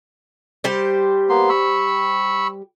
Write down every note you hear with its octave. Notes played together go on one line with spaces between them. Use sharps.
G3 G4 C5
A#3 B3 C6
B5 C#6 E6